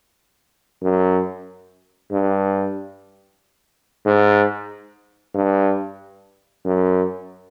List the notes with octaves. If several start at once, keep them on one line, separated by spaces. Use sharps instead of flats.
F#2
G2
G#2
G2
F#2